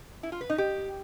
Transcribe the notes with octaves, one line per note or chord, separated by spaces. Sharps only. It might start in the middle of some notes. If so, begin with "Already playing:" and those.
E4
F4
B4
D#4
G4